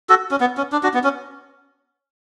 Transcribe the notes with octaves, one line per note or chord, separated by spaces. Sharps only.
F#4 A4
C#4
B3
C#4
D4
D4 F#4
B3
C#4